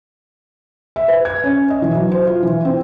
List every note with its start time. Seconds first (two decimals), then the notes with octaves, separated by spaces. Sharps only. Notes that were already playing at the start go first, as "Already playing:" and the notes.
0.96 E5
1.08 B4
1.25 G#6
1.44 C#4
1.70 D#5
1.82 E3
1.95 F#3
2.12 C5
2.27 F4
2.43 E3
2.65 C4